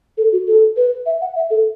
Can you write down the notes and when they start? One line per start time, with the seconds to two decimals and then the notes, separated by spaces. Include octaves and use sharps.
0.18 A4
0.32 F#4
0.47 A4
0.77 B4
1.06 E5
1.21 F#5
1.36 E5
1.50 A4